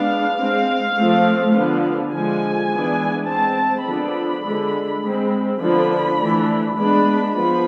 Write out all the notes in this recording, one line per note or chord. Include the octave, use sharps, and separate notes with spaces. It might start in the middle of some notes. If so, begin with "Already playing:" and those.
Already playing: G#3 B3 D4 F5
G#3 C4
F3 A3 C4
D3 F3 B3 D4
D3 F3 G#3 G#5
E3 G#3 B3 D4
G#3 C4 A5
D3 F3 B3 D4 B5
D3 G#3 D4
G#3 C4
D3 F3 B3 D4 B5
E3 A3 D4
G#3 B3 D4 B5
F3 B3 B5